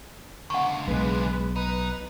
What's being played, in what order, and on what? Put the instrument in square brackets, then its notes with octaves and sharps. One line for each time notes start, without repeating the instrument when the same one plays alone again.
[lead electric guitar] C#2 D3 [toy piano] F#5 C#6
[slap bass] B1 [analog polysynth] G#3 B4
[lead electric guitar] D#4 [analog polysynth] B4